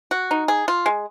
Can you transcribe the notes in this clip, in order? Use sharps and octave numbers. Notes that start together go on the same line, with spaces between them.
F#4
D#4
G#4
F4
G#3